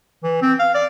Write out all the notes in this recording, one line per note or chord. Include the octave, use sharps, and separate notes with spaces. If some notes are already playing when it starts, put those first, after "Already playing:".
E3
C4
F5
D5